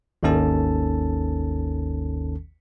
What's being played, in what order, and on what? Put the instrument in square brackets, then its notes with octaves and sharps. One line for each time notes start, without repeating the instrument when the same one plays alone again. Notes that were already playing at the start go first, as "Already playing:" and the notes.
[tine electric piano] G#1 D#2 D#3 C#4 A4 A5